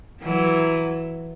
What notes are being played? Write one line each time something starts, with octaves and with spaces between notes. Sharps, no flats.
E3 F#3